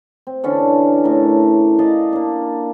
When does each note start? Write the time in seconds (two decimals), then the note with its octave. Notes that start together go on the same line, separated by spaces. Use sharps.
0.27 C4
0.44 D3 E3 C#4 D4
1.04 A2 A#4
1.79 D5 D#5 F5 A5
2.13 A#3 D4